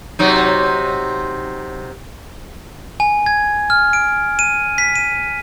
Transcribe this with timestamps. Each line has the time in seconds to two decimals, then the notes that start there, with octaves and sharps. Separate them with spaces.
0.19 C3 F#3 D#4
3.00 G#5
3.26 G#6
3.70 F6
3.93 D7
4.39 D#7
4.78 B6
4.95 D#7